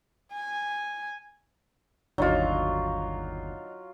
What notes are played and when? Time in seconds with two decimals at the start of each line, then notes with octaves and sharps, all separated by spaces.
0.33 G#5
2.18 G1 D#2 F#3 D4 D#4 F4 F#4